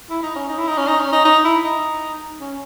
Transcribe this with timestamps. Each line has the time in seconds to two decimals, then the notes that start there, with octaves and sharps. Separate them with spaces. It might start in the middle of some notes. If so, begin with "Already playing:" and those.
0.10 E4
0.23 D#4
0.36 C#4
0.49 D#4
0.58 E4
0.67 D#4
0.77 C#4
0.87 D#4
0.99 C#4
1.12 D#4
1.25 D#4
1.44 E4
1.64 D#4
2.40 C#4